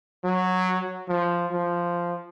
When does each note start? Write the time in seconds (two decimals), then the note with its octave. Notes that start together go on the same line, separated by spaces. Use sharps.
0.24 F#3
1.09 F3
1.52 F3